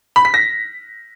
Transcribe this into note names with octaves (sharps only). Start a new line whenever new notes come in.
B5
B6
A#6